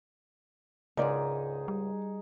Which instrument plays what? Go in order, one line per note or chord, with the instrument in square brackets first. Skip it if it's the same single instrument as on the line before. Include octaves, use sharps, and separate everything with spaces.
[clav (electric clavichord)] C#2 G#2 [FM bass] C#3 [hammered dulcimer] D#4 G#4 [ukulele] A#4 D5
[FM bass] G3